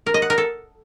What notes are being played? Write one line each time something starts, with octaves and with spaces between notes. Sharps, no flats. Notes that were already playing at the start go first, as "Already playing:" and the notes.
A#4
D#5
F#5
A#4
A4